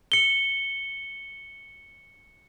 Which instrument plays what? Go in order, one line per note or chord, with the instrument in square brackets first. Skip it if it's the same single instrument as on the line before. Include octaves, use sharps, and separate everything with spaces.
[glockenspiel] C#7 G7